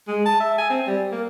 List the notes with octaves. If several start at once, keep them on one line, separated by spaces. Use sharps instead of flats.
G#3
A5
E5
G#5
C4
G3
A#3